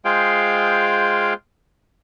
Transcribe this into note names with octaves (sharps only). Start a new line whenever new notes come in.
G#3 F4 G#4 C5 F5 G5